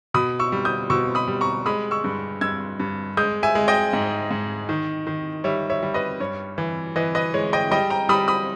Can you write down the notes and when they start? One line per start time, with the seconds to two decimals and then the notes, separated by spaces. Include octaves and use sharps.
0.14 B2 B5 D#6
0.39 C#6 E6
0.52 G3
0.65 D#6 G6
0.90 B2 C#6 E6
1.15 B5 D#6
1.28 G3
1.41 A#5 C#6
1.66 G#3 B5 D#6
1.91 C#6 E6
2.04 G2
2.41 G2 E6 G#6
2.80 G2
3.17 G#3 D#6 G6
3.43 E5 G#5
3.55 G#3
3.68 D#5 G5
3.93 G#2
4.31 G#2
4.69 D#3
5.07 D#3
5.44 G3 C#5 E5
5.70 C#5 E5
5.83 G3
5.94 B4 D#5
6.20 G2 C#5
6.58 E3
6.96 E3 B4 D#5
7.15 B4 D#5
7.34 G#3 C#5
7.53 D#5 G5
7.71 G3 D#5 G5
7.90 G5 A#5
8.09 G3 B5 D#6
8.28 B5 D#6